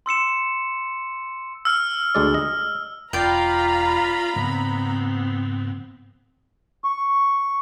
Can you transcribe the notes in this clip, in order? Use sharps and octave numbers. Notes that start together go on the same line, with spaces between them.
C6 E6 C#7 E7
E6 F6
D2 G#3 D5
D#5
E1 F4 D5 F5 G5 A#5 B5
G#2 C#3 F3 B3 C4
C#6